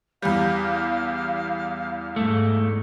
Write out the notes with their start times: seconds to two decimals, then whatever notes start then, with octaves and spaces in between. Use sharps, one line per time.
0.22 E2 G3 F5
2.16 G#2 A3